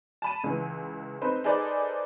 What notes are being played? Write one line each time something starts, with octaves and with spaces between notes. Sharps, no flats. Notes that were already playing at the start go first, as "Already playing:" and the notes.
A5 B5 D#7
C#2 E3
C4 D#4 A4 B4 C5
D#4 G#4 A4 B4 C5 D5